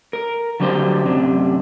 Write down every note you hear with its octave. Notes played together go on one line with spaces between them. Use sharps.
A#4
D3 F#3 G3 D4 C5
F#2 C3 D4